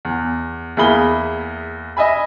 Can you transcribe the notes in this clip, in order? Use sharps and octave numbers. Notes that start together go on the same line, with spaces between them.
E2
E2 A#3 E4 G#4 B5 G7
D#5 E5 G#5 B5